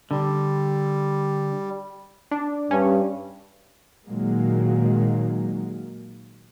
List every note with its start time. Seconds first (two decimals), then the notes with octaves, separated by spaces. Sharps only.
0.11 D3 G3
2.31 D4
2.71 G2 C#4
4.07 A#2 D#3 F#3 G#3 A#3